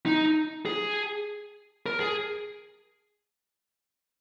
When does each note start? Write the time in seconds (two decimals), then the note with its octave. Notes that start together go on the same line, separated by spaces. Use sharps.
0.06 D#4
0.65 G#4
1.86 A#4
2.00 G#4